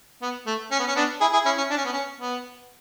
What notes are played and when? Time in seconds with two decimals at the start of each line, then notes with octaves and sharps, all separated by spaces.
0.22 B3
0.47 A3
0.71 C#4
0.79 B3
0.87 C#4
0.96 B3 D4
1.21 E4 G#4
1.33 E4 G#4
1.45 C#4 E4
1.58 C#4
1.70 D4
1.77 C#4
1.85 B3
1.93 C#4
2.20 B3